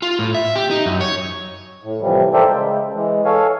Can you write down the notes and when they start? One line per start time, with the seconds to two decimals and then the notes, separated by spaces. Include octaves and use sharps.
0.02 F4
0.19 A2
0.34 E5
0.56 G4
0.71 D#4
0.86 F#2
1.01 C#5
1.83 A2
2.01 A2 C3 E3 F3 G3
2.33 A4 A#4 C5 D5 E5 G5
2.46 C#3 G#3
2.94 E3 G#3
3.25 A4 C#5 F5 G#5